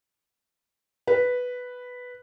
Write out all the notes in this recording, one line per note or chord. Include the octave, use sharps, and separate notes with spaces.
B4